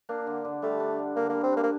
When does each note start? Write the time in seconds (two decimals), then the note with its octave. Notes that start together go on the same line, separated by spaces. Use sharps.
0.09 A#3 D4
0.27 D3
0.45 D3
0.62 G3 A3
0.80 D4
0.99 D3
1.16 D3 A#3
1.29 A#3
1.34 G3
1.43 C4
1.52 A#3 D4
1.63 A#3